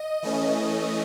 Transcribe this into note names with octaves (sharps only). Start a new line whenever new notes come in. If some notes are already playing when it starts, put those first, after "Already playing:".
Already playing: D#5
E3 A3 C#4